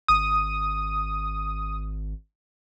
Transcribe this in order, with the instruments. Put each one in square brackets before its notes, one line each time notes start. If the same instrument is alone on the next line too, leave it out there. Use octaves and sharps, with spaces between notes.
[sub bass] G#1 [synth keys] D#6